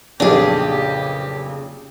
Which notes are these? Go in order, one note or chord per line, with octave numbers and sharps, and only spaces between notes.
B1 F2 A#2 C#3 D4 G4 G#4